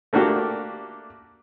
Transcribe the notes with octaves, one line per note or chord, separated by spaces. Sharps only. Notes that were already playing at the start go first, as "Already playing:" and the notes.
A3 A#3 D4 F#4 G4